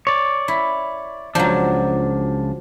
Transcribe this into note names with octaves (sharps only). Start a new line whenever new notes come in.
C#5 D5
E4
C#2 F3 F#3 D4